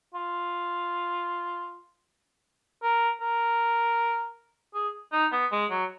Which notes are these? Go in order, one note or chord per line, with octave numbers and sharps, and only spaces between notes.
F4
A#4
A#4
G#4
D#4
B3
G#3
F#3